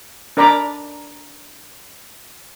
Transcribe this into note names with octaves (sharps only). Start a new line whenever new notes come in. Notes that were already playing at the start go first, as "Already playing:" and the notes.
D4 A#4 D5 A#5 B5 D6